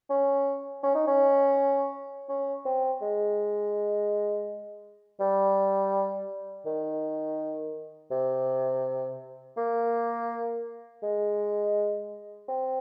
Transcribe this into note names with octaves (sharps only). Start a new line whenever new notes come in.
C#4
C#4
D#4
C#4
C#4
C4
G#3
G3
D#3
C3
A#3
G#3
C4